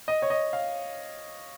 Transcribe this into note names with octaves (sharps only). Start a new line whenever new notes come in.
D#5
C#5
D#5
F5